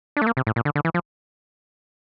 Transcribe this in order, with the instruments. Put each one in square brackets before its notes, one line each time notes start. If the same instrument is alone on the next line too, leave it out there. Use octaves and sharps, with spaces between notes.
[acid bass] D4
A3
A#3
C3
A2
A#2
D3
D3
E3
F3